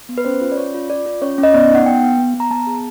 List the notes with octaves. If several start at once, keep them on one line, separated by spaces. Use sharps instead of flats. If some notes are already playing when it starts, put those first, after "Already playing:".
B3
B4
C#4 C5
F4
D5
C#4 C#5
F4
F4 D5
F4
C#4 C#5
C#4
D#5
B3 D5
D#4 F#5
B3 G5
B3
B3
B3
A#5
B3 A5
G#4